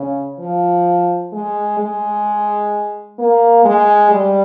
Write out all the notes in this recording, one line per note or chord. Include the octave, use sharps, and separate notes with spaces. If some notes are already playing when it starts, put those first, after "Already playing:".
Already playing: C#3
F3
G#3
G#3
A#3
G#3
G3